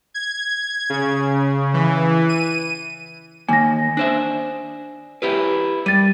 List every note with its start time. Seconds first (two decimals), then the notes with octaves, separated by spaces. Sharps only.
0.14 G#6
0.90 C#3
1.74 E3
2.29 D#7
3.49 D#3 A#3 G#5 A#6
3.97 D4 C5 E5
5.22 E4 G4 B4
5.86 G3 A6 D#7